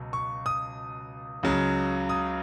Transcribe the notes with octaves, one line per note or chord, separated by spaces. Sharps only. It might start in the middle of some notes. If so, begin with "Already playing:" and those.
Already playing: C#2 B2 F#3
C#6
D#6
C#2 C#3 F#3
D#6